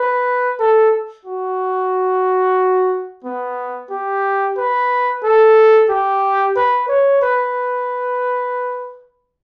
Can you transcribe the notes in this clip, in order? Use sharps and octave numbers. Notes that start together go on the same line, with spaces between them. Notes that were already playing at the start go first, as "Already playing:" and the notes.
Already playing: B4
A4
F#4
B3
G4
B4
A4
G4
B4
C#5
B4